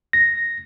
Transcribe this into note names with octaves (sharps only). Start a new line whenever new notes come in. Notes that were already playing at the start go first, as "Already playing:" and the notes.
A#6